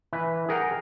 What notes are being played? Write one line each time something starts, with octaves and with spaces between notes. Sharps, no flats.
E3 B4
G#4 A#4 F#5 G5 A#5